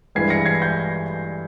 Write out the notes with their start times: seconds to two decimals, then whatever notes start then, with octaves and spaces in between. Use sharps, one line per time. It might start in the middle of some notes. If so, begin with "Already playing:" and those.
0.15 G2 E3 G#3 G#6 C7
0.30 A#6 C#7
0.46 G#6 C7
0.62 G6 A#6